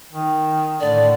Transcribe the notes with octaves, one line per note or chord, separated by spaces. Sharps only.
D#3
A2 D3 D5